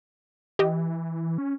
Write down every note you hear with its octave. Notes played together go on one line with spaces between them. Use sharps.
E3 G4 D#5
C#4